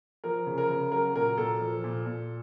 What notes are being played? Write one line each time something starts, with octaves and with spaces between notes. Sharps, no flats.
F3 A#4
C#3
A#4
C#3
F#3 A#4
A#2 A#4
A#2 A4
F3
A#2
A#2